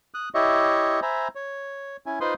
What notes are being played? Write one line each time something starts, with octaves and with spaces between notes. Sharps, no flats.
D#6 F#6
E4 G4 C#5 D#5 E5 C#6
C5 E5 G#5 A#5 B5
C#5
C#4 E4 G#5
D#4 F4 B4 C5 C6 D#6